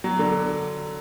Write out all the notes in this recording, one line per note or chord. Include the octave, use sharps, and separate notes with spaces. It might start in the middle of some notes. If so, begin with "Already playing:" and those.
F#3
D3